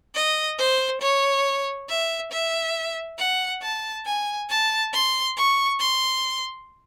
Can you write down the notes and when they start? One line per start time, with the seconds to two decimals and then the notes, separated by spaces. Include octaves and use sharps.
0.15 D#5
0.58 C5
1.01 C#5
1.89 E5
2.31 E5
3.18 F#5
3.62 A5
4.06 G#5
4.49 A5
4.93 C6
5.37 C#6
5.79 C6